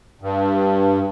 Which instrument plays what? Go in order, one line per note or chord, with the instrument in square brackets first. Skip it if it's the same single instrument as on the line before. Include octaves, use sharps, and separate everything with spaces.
[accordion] G2